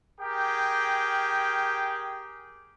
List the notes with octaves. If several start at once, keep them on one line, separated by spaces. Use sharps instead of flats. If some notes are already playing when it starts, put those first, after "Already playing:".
G4 G#4 A#4 G5